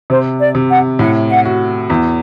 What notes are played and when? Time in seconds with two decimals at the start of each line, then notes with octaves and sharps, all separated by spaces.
0.09 C3 C5
0.39 D5
0.55 C3
0.69 F#5
0.99 A2 F#5
1.29 F#5
1.45 F#4
1.90 E2